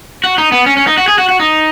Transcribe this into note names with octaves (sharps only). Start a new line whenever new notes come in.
F#4
D#4
B3
C#4
C#4
D#4
F#4
G#4
F#4
F#4
D#4